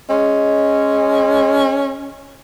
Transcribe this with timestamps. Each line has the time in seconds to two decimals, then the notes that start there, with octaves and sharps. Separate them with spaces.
0.10 G#3 C#4